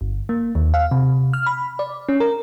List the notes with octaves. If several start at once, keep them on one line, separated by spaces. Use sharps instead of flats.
G1
A#3
D#2
F5
C3
F6
B5
D5
C#4
A#4